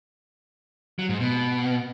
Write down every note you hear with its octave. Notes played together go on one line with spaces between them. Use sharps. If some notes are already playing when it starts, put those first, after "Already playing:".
F#3
G#2
B2